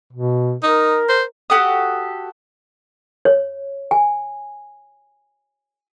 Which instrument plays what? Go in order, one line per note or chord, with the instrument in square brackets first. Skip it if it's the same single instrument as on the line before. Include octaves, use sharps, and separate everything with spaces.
[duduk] B2
[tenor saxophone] D#4 [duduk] A#4
[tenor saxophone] C5
[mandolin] F#4 G4 A4 D#6
[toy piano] C#5
G#5